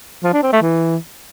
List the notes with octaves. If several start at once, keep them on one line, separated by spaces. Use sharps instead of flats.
F3
D4
C4
A3
E3